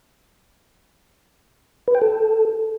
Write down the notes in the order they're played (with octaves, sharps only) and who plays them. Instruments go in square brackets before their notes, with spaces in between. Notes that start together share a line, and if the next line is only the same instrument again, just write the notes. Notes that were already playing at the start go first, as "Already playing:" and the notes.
[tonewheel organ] B4
G5
A4